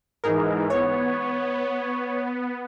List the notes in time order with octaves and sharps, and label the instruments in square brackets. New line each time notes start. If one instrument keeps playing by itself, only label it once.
[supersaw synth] G#2 E3 [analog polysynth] D#4 G#4 A#4
[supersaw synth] B3 [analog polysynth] C#5